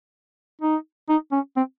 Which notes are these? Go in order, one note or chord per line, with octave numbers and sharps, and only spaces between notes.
D#4
D#4
C#4
C4